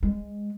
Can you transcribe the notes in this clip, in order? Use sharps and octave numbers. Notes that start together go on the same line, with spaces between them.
G#3